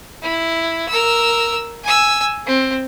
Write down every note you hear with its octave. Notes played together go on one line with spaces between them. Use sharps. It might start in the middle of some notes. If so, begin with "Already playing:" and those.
E4
A#4 E6
G#5 E6
C4